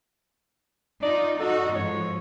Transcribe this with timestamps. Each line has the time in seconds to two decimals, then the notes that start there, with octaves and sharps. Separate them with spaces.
1.03 D#4 F4 D5
1.40 D#4 F#4 A4
1.75 G#2 F3 C#5